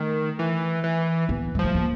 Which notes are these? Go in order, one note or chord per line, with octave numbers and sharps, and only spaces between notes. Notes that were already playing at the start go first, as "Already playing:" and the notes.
Already playing: D#3 A3
E3
E3
B3
G#3
F3
A3
A#3